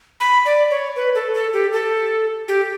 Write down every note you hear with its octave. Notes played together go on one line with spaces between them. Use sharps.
B5
D5
C#5
B4
A4
A4
G4
A4
G4